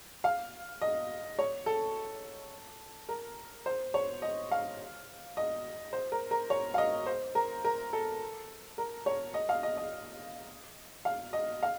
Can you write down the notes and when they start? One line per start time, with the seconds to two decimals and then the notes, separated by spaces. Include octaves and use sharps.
0.24 F5
0.82 D#5
1.39 C#5
1.66 A4
3.09 A#4
3.66 C5
3.94 C#5
4.22 D#5
4.51 F5
5.37 D#5
5.93 C5
6.12 A#4
6.31 A#4
6.50 C#5
6.74 F5
6.78 D#5
7.06 C5
7.35 A#4
7.65 A#4
7.93 A4
8.78 A#4
9.06 C#5
9.34 D#5
9.49 F5
9.63 D#5
9.77 D#5
11.05 F5
11.33 D#5
11.63 F5